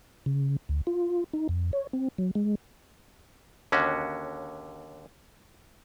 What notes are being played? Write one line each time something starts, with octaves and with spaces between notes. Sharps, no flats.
C#3
D2
F4
D#4
F2
C#5
C4
F#3
G#3
D#2 D3 C#4 F#4